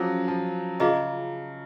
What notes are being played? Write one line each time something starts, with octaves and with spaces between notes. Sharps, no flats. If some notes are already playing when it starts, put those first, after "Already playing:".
Already playing: F3 F#3 C#4 G#4
F3
C#3 F4 G#4 D#5 A#5